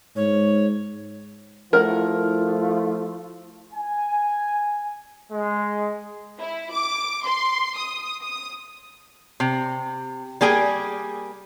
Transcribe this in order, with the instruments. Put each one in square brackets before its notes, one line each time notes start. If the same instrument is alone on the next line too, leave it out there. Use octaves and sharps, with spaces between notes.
[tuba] G#2 [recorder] C#5
[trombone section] F3 A3 F4 [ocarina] E4 [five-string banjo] A#4 F#5
[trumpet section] G#5
G#3
[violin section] E4
D6
C6
D#6
D#6
[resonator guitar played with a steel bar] C3
G3 A#3 G#4 G#5